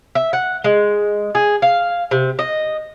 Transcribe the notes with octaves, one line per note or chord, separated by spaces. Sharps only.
E5
F#5
G#3
G#4
F5
C3
D#5